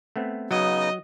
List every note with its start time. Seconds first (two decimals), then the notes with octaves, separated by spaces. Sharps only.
0.16 A3 B3 C4
0.51 C#3 F#3 B3 D#4 D#5